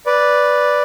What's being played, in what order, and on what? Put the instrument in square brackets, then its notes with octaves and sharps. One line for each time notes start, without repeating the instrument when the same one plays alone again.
[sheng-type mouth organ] B4 D5